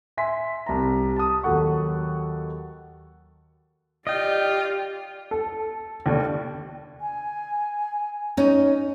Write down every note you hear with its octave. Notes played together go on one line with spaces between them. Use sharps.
E5 G#5 C6 B6
C2 A5 A#5
A5 D#6
D#2 F#3 A4 F#5 C#6
F4 G4 D5 D#5 G5
A4
D#2 D3 A3 D5
G#5
C#4 D#4